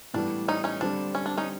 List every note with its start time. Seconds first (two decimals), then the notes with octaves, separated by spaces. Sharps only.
0.14 A2 E3 G3 B3 D4
0.48 C#4 D#4
0.64 C#4 D#4
0.81 D3 G3 C4 D4
1.15 C#4
1.26 D4
1.37 C#4 D#4